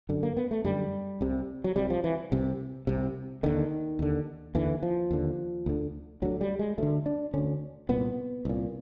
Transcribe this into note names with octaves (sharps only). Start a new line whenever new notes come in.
F#2 D3
A#3
B3
A3
F#2 D3 G3
C2 C3
F#3
C2 C3 G3
F3
E3
C2 C3
C2 C3
D#2 D3 D#3
D#2 D3
D#2 D3 E3
F3
D#2 D3
D2 D3
D2 D3 F#3
G3
G#3
D2 D3 A3
D4
D2 D3 C#4
C2 A#2 B3
C2 A#2